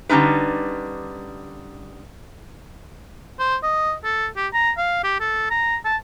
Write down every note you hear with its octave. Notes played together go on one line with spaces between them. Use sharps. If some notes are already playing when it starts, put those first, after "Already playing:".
D3 G3 C#4 D#4 B4
C5
D#5
A4
G4
A#5
F5
G4
A4
A#5
A5